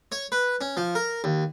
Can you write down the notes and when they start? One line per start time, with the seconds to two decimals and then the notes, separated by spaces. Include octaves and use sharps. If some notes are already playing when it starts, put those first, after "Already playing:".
0.12 C#5
0.32 B4
0.61 C#4
0.77 F3
0.95 A#4
1.24 D#2